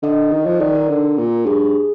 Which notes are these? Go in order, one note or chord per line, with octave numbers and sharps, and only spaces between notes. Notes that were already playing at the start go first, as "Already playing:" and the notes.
D3 D#5
D#3
F3
D#3 D5
A#4
D3
A#2
G2 G#4